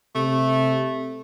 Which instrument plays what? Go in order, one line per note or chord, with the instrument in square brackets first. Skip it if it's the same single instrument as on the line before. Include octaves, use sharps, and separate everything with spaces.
[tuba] C3 [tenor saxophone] A3